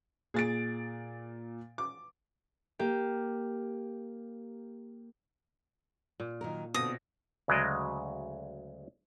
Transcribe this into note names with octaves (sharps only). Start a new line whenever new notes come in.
A#2 G#4 A6 D7
D6
A#3 G4
A#2
D#3 F#3 A#4
B2 D3 C4 F4 D#6 A#6
D2 C#3 F#3 G#3 D5 D#5